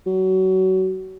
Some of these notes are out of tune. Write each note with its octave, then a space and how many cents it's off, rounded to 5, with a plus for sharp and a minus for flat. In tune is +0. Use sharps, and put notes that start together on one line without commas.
F#3 +25